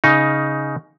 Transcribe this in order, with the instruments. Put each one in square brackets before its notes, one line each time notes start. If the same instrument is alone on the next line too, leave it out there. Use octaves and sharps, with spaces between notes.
[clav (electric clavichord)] C#3 D#4